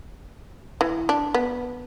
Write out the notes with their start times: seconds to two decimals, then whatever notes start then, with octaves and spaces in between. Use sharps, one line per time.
0.81 E3
1.09 D4
1.34 B3